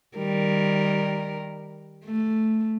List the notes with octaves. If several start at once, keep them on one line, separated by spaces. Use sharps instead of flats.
D#3 G3 A#4
A3